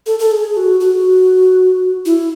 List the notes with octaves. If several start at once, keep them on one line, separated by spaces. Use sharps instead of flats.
A4
A4
G#4
F#4
F#4
E4